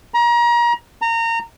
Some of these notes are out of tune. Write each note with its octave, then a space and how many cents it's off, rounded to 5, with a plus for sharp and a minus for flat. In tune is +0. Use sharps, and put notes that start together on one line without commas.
A#5 +30
A#5 -25